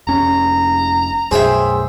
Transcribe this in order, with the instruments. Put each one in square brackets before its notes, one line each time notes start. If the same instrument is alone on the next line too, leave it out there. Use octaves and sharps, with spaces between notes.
[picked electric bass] F1 C#4 [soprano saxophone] A#5
[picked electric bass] B1 F#2 [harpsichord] G#4 G5 [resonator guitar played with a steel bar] C5 E5